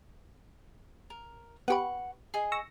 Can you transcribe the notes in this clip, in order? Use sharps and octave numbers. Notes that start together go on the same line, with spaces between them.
A#4
B3 G4 B4 F#5 C#6
G#4 D#5 C7
C#6 E6 A#6